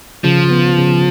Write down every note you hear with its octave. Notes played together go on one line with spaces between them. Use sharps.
C#3 F3
B3
C#3